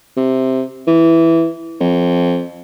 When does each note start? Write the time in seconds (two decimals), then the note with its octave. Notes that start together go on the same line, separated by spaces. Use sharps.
0.17 C3
0.87 E3
1.81 F2